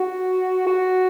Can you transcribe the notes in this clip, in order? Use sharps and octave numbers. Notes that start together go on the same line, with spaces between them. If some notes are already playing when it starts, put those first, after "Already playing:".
Already playing: F#4
F#4